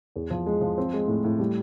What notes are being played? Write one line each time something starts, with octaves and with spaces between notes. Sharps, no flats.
E2
F3
G#3
F3
C4
G#3
A2
A2
G3